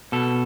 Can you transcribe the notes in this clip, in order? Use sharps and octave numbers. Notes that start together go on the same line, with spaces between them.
B2 A4